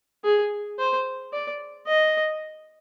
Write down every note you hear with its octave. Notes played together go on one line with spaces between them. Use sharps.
G#4
C5
D5
D#5